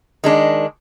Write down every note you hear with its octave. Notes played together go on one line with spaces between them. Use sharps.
D#3 G#3 D4